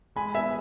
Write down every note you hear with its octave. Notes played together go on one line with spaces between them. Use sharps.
G#3 G#5 B5
B3 E5 G#5